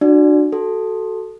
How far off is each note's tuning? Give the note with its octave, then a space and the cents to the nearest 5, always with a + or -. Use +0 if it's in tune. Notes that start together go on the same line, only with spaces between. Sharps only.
D4 +35 F#4 +0 D5 +0
F#4 +25 A4 +0